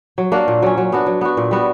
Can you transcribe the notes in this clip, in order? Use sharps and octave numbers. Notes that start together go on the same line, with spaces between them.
F#3
A#3 D4 F#4
A#2
F#3 C#4
F#3
B3 D4 F#4
F#3
B3 F#4
A#2
G3 B3 F#4